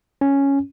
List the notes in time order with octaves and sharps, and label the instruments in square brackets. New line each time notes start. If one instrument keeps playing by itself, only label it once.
[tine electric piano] C#4